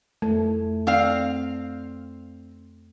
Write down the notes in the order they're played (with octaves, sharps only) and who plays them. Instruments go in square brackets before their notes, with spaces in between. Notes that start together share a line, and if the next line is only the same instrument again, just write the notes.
[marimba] F2 [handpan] A3
[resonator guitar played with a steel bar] C4 F5 [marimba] D5